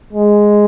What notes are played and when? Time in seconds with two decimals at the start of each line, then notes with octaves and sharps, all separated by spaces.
0.13 G#3